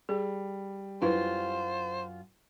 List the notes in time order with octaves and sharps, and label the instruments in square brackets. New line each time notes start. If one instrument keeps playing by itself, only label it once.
[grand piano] G3 [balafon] G#4
[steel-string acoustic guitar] F#2 F4 [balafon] D4 E4 B4 [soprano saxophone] C5